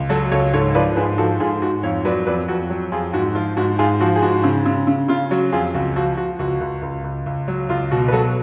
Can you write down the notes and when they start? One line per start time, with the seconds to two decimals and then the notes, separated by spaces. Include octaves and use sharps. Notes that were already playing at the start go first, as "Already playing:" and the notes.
Already playing: C#2
0.09 F#3 F#4 A4
0.32 C#2 A4 C#5
0.53 G#2 A4 C#5
0.75 F3 B4 D5
0.97 G#2 G#4 B4
1.18 F3 F#4 A4
1.40 G#2 F4 G#4
1.62 G#2 F#4
1.83 F2 C#5 F5
2.05 F#3 B4 D5
2.27 F2 B4 D5
2.48 F2 F#4
2.70 F#3
2.92 F2 F4 G#4
3.13 G#2 F#4
3.35 F3 F4
3.57 G#2 F#4
3.79 G#2 F4 G#4
4.00 F3 F#4
4.16 G#4
4.22 G#2 F#4
4.44 C#3
4.66 C#3
4.87 C#3
5.08 C#3 F4
5.31 F#3 F#4
5.52 F2 F4 G#4
5.74 C#2 F#4
5.96 F3 F#4
6.17 F3 F#4
6.39 C#2 F#4
6.61 C#2
6.82 C#2
7.04 C#2
7.26 C#2
7.48 F#3
7.69 C#2 F4
7.91 B2 F#4
8.08 B4
8.12 F#3 F#4 A4